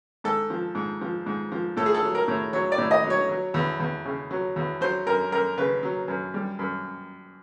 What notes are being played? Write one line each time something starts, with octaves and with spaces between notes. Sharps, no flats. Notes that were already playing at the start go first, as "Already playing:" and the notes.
G#2 A4
F3
G#2
F3
G#2
F3
A2 A4
G#4
A4
F#3
A#4
A2
F#3 C#5
D5
A2
D#5
F#3
C#5
F#3
E2
E2
C#3
F#3
E2
F#3 C5
F#2 A#4
F#2 A#4
C#3 B4
F#3
F#2
G3
F#2